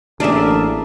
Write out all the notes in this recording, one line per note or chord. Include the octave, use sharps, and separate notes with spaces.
A1 A#3 D4 G#4 A#4 D5 E5